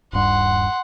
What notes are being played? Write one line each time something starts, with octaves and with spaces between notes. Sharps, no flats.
D#1 G2 F#5 C6